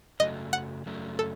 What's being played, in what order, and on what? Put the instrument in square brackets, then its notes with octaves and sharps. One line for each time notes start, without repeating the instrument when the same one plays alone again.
[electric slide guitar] F#2 C#3 F#3 A3 [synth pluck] D#5
[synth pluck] F#5
[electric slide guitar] F#2 C#3 F#3 A3
[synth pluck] A4